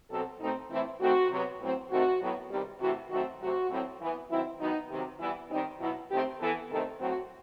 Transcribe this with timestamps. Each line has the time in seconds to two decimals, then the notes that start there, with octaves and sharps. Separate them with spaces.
0.10 B2 F#3 C4 A4
0.40 B2 A3 C4 D#4
0.70 A2 E3 A3 C4 E4
1.00 D#3 A3 C4 F#4
1.30 C3 F#3 B3
1.60 A2 F#3 C4
1.90 C3 D#3 A3 C4 F#4
2.20 A2 F#3 B3
2.50 C3 D#3 G3
2.80 C3 E3 A3 F#4
3.10 D#3 F#3 A3 C4 F#4
3.40 C3 F#3 A3 C4 F#4
3.70 A2 F#3 C4
4.01 E3 B3
4.30 D#3 F#3 C4 E4
4.60 D#3 F#3 B3 D#4
4.90 C3 D#3 F#3
5.20 E3 G3 B3 E4
5.50 D#3 G3 C4 D#4
5.80 B2 F#3 B3 E4
6.10 D#3 A3 C4 G4
6.40 E3 B3 A4
6.70 C3 D#3 A3 C4 A4
7.00 A2 F#3 C4 F#4